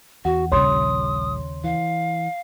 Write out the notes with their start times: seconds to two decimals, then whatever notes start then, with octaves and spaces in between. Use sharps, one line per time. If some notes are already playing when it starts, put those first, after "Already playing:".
0.25 E2 F#4 F#5
0.52 A#1 D#2 C#3 G3 C#5 C6 D#6
1.64 E3 F5